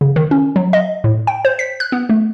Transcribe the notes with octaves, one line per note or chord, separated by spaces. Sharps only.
C#3
D#3
C#4
F#3
D#5
A2
G5
C5
B6
F#6
B3
A3